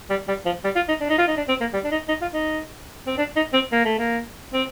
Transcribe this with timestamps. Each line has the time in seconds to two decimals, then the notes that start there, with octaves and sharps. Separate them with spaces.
0.10 G3
0.28 G3
0.46 F3
0.64 G3
0.76 F4
0.89 D#4
1.01 D4
1.10 D#4
1.19 F4
1.28 D#4
1.37 D4
1.49 C4
1.61 A#3
1.73 G3
1.84 D4
1.92 D#4
2.08 D#4
2.22 F4
2.33 D#4
3.07 C4
3.18 D4
3.36 D#4
3.54 C4
3.72 A#3
3.85 A3
3.99 A#3
4.54 C4